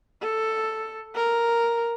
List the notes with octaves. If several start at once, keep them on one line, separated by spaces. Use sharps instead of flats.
A4
A#4